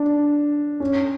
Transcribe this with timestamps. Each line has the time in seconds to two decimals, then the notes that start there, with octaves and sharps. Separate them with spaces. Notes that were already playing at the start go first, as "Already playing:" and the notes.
Already playing: D4
0.80 C#4